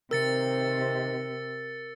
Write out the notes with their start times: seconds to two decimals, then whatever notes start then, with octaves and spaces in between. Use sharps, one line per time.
0.11 C3 D#3 C4 A#4 E6 A6 C#7